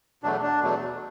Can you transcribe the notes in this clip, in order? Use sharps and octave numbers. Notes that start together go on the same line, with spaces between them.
E2 B2 F#3 A3 D4
D4
E2 B2 F#3 A3